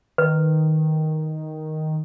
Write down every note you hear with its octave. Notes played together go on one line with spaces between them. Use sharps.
D#3 B4